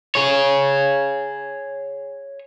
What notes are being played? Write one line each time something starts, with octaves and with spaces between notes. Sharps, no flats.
G#4 C#5